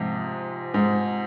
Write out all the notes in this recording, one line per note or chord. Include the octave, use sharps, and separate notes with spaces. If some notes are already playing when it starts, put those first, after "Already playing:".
Already playing: G#2 C3 F3
G#2